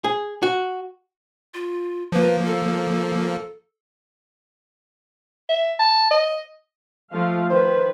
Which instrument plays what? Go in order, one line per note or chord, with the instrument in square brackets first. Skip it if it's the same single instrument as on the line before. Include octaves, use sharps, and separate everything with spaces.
[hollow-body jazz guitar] G#4
F#4
[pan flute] F4
[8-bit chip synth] F3 A#3 [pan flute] B4
[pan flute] A4
[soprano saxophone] E5
A5
D#5
[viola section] F3 A3 F5
[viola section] D#3 B4 [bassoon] C5